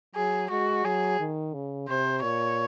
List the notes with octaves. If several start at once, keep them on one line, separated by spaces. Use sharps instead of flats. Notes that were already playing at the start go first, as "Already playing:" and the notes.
F#3 G#4
G#3 F#4
F#3 G#4
D#3
C#3
C3 C5
A#2 C#5